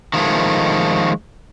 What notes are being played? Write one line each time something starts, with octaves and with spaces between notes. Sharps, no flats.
D#3 F3 G#3 A3